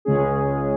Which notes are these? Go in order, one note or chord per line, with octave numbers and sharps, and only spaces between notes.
C#2 C#3 G#3 C#4 G#4